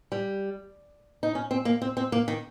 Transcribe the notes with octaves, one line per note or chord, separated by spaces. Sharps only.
G3
D#4
C#4
C4
A#3
C4
C4
A#3
D#3